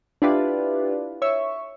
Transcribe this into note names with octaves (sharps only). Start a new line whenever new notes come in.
D4 E4 F4 G4 B4 D5
C#5 E5 C#6